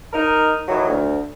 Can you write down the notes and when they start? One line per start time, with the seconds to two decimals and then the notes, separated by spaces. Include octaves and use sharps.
0.13 D#4 A#4
0.68 A2 D#3 E3 F#3
0.88 D2